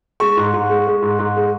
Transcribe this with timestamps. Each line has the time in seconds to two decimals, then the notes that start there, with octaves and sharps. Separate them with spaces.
0.20 G#3 C#6
0.37 G#2
0.54 G#2
0.69 G#3
0.87 G#3
1.02 G#2
1.19 G#2
1.36 G#3